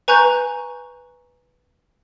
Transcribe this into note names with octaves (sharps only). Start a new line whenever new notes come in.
B4 G#5 A#5 C#6 F#6 G6